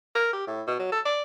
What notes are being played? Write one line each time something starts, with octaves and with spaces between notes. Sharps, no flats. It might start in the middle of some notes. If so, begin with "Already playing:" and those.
A#4
G4
A2
B2
F#3
A4
D5